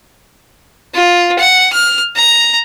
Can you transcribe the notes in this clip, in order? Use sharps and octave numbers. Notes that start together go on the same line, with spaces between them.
F4
F#5
F6
A#5